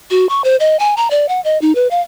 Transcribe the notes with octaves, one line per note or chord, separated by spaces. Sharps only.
F#4
C#6
C5
D#5
G#5
A#5
D5
F#5
D#5
D#4
B4
F5